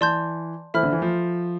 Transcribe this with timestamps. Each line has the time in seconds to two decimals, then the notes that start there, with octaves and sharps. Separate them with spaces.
0.01 E3 D5 A5 C6 G6
0.74 E3 A4 C5 E5 B5 F6
0.83 D3
0.92 E3
1.02 F3